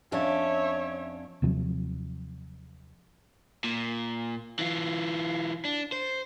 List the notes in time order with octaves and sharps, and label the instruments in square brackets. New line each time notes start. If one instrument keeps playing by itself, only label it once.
[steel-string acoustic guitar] F2 C#4 D4 [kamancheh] C#5 E5
[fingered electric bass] D#2 C3 F3 F#3
[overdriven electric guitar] A#2
E3 F4
D4
C5